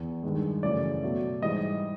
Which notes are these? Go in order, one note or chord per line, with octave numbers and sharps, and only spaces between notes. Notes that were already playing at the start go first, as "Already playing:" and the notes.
Already playing: E2
G2 D#3 G#3
F#2 C#3 E3 A3 D5
B2 F#3 A3
G#2 E3 G3 D#5